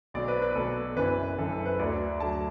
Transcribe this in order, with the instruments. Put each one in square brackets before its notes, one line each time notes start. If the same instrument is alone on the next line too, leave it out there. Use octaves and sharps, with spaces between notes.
[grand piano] B1 B2 F#3 D5
B4
B4
B1 B2 F#3 A4
F#1 F#2 E3 B4
F#1 F#2 E3 A4
A4
B4
D2 D3 F#3 D5
D2 D3 F#3 A5